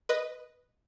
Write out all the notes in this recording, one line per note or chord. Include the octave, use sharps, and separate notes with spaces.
B4 D#5